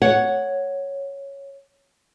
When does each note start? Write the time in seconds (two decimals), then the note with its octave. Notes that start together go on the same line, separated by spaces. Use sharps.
0.02 C#5 F#5